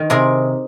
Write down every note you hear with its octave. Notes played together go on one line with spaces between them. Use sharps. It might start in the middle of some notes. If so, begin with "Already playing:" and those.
Already playing: D#3
C3 G#4 A#4